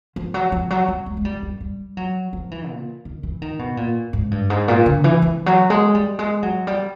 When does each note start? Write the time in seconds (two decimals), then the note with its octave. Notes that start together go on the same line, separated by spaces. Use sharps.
0.16 F3
0.34 F#3
0.52 F3
0.70 F#3
0.88 G3
1.06 G#3
1.17 G#3
1.25 G3
1.42 G3
1.61 G3
1.97 F#3
2.33 F3
2.51 E3
2.69 A#2
3.05 D#3
3.23 E3
3.42 D#3
3.59 B2
3.77 A#2
4.13 G#2
4.31 G2
4.50 G#2
4.68 A#2
4.86 D3
5.04 E3
5.22 E3
5.46 F#3
5.70 G#3
5.95 G3
6.19 G#3
6.43 F#3
6.67 G3